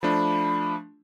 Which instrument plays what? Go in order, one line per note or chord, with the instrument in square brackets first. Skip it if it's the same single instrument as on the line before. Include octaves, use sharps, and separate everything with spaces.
[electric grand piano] F3 A3 D4 [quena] B5